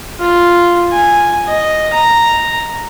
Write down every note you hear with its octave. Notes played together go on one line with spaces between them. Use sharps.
F4
G#5
D#5
A#5